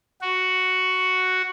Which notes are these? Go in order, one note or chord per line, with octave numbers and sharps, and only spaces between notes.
F#4